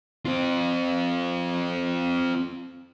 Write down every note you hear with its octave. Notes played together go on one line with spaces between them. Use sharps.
C4 F4